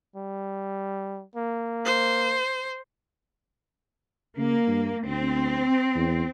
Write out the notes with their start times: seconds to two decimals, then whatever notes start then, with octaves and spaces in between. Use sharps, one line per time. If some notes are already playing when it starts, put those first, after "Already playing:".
0.16 G3
1.36 A#3
1.85 C5
4.37 C#3 A#3
4.68 G2
5.06 D2 C4
5.95 E2